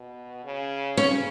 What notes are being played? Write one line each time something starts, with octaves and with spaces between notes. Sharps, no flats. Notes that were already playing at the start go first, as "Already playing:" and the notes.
Already playing: B2
C#3
C#3 C#4